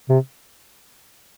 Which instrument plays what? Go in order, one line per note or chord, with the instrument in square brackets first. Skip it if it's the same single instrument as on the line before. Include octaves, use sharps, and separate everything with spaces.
[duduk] C3